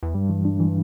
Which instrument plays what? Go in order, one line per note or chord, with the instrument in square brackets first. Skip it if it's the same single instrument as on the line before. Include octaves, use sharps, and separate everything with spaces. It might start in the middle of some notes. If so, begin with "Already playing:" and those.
[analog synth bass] E2
[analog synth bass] G2 [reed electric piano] G3
[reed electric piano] E3
D4
E3